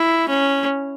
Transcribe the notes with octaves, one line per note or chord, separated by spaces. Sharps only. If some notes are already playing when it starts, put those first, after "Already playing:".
Already playing: E4
C#4